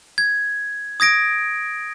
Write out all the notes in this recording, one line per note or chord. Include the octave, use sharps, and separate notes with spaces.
G#6
D#6 G#6 A#6 D7